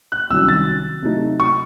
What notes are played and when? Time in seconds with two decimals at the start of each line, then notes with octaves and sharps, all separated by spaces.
0.12 F#6
0.30 C2 C3 D#3 F#3 C#4 E6
0.48 A6
1.02 C3 F#3 A3 D#4
1.40 C#6